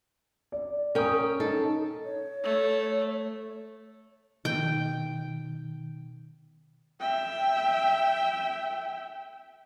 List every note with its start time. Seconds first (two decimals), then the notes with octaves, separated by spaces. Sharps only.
0.52 D5
0.95 C#4 A#4 G5 D#6
1.40 D#4 A4
2.05 C#5
2.44 A3
4.45 B2 D#3 G5
7.00 E5 G5